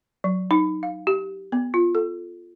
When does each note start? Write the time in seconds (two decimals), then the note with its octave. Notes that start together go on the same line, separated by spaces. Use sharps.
0.24 F#3
0.51 D#4
0.83 F5
1.07 G4
1.52 B3
1.74 F4
1.95 A4